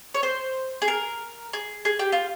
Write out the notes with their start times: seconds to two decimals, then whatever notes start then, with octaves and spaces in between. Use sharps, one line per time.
0.14 C#5
0.23 C5
0.82 G#4
0.88 A#4
1.53 G#4
1.85 G#4
1.99 G4
2.12 F4